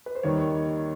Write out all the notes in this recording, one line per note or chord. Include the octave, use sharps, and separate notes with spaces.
B4
C5
D#2 D#3 G3 C#5